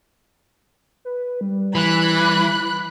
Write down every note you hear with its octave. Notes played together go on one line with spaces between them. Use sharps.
B4
G3
E3 B5 F#6